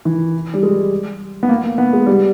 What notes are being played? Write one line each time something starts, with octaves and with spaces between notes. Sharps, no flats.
E3
G3
G#3
B3
A#3
A#3
B3
G#3
G3